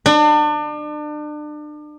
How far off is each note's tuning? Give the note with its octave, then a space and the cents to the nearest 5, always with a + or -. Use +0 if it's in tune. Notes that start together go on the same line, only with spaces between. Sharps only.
D4 +35